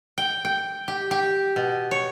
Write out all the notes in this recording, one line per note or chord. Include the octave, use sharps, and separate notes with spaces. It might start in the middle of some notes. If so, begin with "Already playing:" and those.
G5
G5
G4
G4
B2
C#5